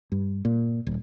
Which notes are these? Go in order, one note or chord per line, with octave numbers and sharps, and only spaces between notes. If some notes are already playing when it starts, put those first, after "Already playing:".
G2
A#2
D#1